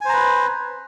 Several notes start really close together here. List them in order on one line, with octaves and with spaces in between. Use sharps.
G#5 C5 A#5 B4